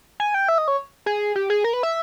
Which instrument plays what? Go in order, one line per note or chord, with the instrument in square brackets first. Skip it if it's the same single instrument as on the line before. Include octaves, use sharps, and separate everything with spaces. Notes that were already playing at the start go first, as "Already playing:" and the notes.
[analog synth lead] G#5
G5
E5
D#5
C#5
G#4
G4
G#4
A#4
B4
E5